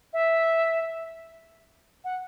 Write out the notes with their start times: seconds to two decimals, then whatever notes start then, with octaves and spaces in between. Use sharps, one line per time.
0.13 E5
2.04 F#5